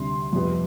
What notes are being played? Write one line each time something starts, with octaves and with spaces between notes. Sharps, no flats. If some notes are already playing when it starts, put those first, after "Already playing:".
Already playing: D2 C3 G3 C6
F2 C3 G3 B3